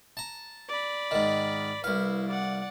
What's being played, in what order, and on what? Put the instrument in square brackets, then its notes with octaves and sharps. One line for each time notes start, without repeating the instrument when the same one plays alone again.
[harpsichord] A5 A#5
[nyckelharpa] D5 B5
[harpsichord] G#2 D#3
[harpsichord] C2 F5 [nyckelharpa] E4 B4
[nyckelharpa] D5 F#5